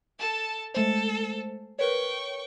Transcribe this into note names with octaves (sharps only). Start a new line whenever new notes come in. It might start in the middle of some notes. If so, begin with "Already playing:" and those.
A4 A5
G#3 A3 A4 C5
A#4 B4 C#5 G5 C#6